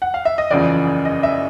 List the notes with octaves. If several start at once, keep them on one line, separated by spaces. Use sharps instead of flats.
F#5
F5
E5
D#5
F#1 E2 C#3 F3 D5
D#5
E5